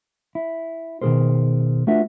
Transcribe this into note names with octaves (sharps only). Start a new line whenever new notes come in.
E4
B2 D#3 F#3 G#4 A#4 C5
A3 D4 F4 F#4 B4 E5